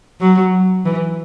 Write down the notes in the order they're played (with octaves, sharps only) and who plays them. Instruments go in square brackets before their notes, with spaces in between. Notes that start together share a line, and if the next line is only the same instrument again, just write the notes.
[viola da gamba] F#3
E3